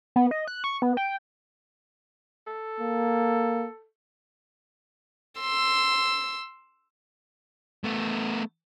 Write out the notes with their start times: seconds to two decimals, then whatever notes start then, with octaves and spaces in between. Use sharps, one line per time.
0.16 B3
0.31 D#5
0.48 F#6
0.64 C#6
0.82 B3
0.97 G5
2.47 A4
2.80 A#3
5.40 C6 E6
7.84 A3 B3